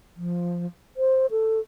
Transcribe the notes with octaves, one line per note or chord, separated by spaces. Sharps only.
F3
C5
A4